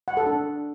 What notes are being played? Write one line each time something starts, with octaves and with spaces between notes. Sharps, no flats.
F#5
A4
D4